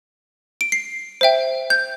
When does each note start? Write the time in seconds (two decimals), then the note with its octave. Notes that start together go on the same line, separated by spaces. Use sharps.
0.61 D7
0.72 C7
1.21 C5 E5 G5
1.70 G6